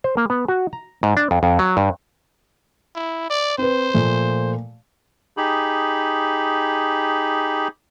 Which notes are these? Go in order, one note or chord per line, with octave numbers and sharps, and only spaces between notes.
C5
A#3
B3
F#4
A#5
G#2
D4
F2
F2
F#3
G2
E4
D5
C4 B4 C5
A#2 F3 A3
D#4 G4 G#4 B5